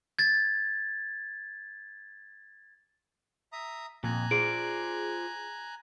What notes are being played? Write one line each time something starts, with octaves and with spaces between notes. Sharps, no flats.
G#6 A6
E5 A#5 D#6
F2 A#2 G#5 A#5 F#6
F4 G#4 C5 D5 D7